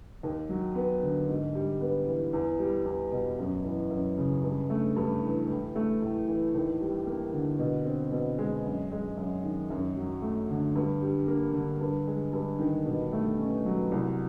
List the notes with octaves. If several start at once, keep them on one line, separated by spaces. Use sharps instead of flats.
D#2
F#3
B3
D3
G#2
G3
B3
E3
E2
G3
E2
B2
F#2
E3
F#2
C#3
G2
A3
G2
E3
A2
A3
A2
E3
D#2
G3
A#3
D3
B2
C4
B2
G#3
F#2
G#3
F#2
D#3
F#2
F#3
A3
D3
G2
G3
A#3
D3
G2
G#3
G2
D#3
B2
A3
C#4
F#3
C2